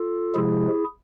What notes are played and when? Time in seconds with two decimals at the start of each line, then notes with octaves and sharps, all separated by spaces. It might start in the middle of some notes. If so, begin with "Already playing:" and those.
Already playing: F4 A4
0.35 C3 F3 G#3 E4 G#4